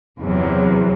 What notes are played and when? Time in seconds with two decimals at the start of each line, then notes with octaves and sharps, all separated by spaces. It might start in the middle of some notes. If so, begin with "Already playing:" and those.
0.21 E2 C3 F#3